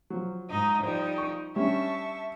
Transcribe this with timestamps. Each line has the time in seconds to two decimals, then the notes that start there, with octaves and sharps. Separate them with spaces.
0.10 F3 F#3
0.50 G#2 D#4 D#5
0.83 F3 G3 D#4 C5
1.18 C#6
1.56 G3 C#4 D4 E5 A5 C#6